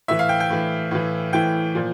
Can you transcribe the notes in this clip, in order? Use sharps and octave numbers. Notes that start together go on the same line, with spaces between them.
A2 E3 E5
F5
G5
G5
A2 E3
A2 E3
A2 E3 G5
A#2 F3